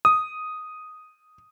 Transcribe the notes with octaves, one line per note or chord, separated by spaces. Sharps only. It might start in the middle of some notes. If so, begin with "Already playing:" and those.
D#6